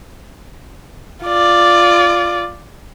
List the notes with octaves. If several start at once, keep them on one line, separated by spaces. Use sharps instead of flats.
F4 D5